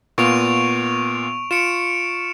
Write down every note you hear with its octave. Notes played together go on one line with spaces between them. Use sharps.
A#2 B3 F4 C#6 D7 F7
F4 C#7 D7 E7